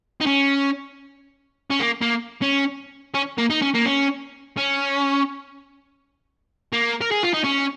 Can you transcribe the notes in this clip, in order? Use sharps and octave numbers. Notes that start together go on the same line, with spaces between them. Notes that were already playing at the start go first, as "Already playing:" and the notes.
D#4
C#4
C#4
A#3
A#3
C#4
C#4
A#3
D#4
C#4
A#3
C#4
C#4
A#3
A#4
G#4
F4
D#4
C#4